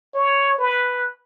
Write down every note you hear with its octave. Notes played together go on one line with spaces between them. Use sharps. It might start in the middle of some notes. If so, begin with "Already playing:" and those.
C#5
B4